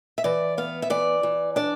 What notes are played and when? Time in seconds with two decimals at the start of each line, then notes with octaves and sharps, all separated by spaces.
0.18 E5
0.24 E3 D5
0.58 B3 F5
0.82 E5
0.90 E3 D5
1.23 E3
1.56 D4 D5